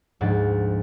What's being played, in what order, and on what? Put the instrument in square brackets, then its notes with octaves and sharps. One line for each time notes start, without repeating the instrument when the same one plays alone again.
[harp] D2 G#2 F3 F#5 A6